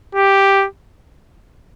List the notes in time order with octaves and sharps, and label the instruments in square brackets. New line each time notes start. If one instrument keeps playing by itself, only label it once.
[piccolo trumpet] G4